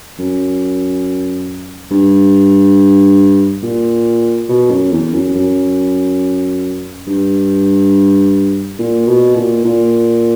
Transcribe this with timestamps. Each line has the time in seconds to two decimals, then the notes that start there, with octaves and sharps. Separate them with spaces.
0.19 F#2
1.91 G2
3.63 A#2
4.49 B2
4.70 F#2
4.92 E2
5.14 F#2
5.35 F#2
7.07 G2
8.79 A#2
9.07 B2
9.36 A#2
9.65 A#2